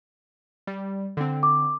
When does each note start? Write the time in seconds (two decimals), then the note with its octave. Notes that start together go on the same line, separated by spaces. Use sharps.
0.67 G3
1.17 D3 C4
1.43 D6